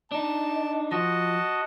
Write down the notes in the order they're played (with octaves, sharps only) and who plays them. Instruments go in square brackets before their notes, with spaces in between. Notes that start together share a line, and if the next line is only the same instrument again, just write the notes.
[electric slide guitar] D4 D#4 [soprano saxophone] A5
[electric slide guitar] F3 [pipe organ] F#4 D#5 [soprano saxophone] A5